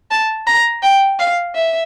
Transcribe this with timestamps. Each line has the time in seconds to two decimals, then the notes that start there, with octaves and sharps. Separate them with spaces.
0.11 A5
0.46 A#5
0.82 G5
1.19 F5
1.55 E5